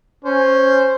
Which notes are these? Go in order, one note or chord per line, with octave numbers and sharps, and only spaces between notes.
C#4 C5